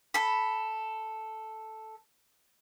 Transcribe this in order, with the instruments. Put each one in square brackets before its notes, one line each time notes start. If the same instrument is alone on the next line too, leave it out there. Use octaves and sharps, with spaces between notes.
[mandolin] A4 B5